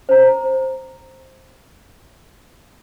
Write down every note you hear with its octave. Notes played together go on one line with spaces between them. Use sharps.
C5 A#5